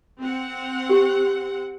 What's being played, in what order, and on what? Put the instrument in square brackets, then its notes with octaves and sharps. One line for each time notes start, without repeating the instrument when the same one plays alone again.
[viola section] C4 F#5
[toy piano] G4